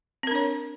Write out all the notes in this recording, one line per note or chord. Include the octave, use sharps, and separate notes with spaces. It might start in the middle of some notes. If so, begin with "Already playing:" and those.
C4 D4 A#4 C#5